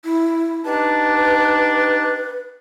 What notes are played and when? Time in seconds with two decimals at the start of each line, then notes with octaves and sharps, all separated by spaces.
0.05 E4
0.65 D4 D#4 G4 B4 A5